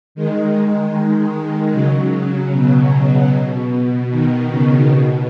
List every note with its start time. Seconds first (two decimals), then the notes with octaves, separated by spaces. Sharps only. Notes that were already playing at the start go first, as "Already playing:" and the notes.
0.15 D#3 G#3
1.73 C#3 F#3
2.52 B2
4.10 B2 D#3
4.50 C#3
4.89 B2